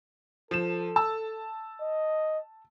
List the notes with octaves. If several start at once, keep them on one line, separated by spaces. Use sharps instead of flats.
F3 A4 E7
A5 E6
D#5